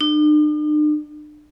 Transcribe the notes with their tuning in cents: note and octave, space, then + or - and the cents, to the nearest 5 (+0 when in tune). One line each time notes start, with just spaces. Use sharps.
D4 +45